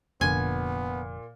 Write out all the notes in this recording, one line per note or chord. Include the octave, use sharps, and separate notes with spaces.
F1 A#2 D3 F3 B3 G#5